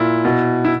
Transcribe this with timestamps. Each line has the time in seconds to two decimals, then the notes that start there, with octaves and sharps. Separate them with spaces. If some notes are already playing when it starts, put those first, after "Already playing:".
Already playing: A#2 E4
0.25 B2
0.65 E4